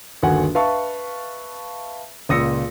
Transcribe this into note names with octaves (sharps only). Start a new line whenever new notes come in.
G1 D#2 F#4 F#5 G#5
B4 E5 F5 A5 C#6
C#2 A#2 D#6 E6 A#6 C#7